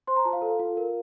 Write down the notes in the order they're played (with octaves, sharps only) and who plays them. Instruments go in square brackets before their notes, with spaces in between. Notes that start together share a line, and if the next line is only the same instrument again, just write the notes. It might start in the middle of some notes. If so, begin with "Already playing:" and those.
[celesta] C5 C6
A#5
F4 A5
F5
A4
F4
A#4